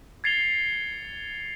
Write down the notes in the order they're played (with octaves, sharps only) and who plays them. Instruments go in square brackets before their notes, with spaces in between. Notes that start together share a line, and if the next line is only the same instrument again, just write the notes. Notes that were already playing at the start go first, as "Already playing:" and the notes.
[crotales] G#6 A6 C7 C#7 F7 G7